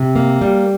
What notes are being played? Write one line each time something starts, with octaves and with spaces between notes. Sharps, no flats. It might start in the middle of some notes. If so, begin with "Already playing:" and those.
Already playing: C3
A#3
G3